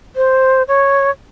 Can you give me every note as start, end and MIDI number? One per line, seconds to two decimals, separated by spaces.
0.16 0.63 72
0.68 1.10 73